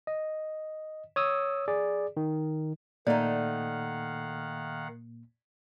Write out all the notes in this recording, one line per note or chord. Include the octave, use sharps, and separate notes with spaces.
D#5
C#5 D#6 E6
G#4 D5
D#3
A#2 D#3 A3 A#3 D#4 D5 F5 F#5